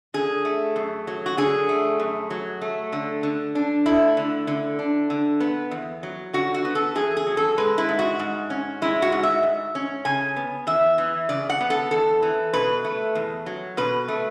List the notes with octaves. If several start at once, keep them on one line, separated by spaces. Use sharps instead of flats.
D3 G#4
A3
F#2
F#3
F#4
D3 G#4
A3
F#2
F#3
A3
D3
D3
D4
A3 E4
D3
D3
D4
D3
B3
E2
F#3
D3 F#4
F#4
B3
A4
E2 G#4
G#4
F#3
A4
G#3 B4
E4
G#2
F#4
G#2
C#4
G#3 E4
F#4
G#2
E5
G#2
C#4
C#3 G#5
B3
E2 E5
E3
C#3 D5
F#5
B3
A4
E2 A4
E3
B2 B4
A3
E2
F#3
B2 B4
A3